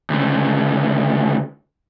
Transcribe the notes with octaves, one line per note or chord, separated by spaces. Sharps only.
D2 C#3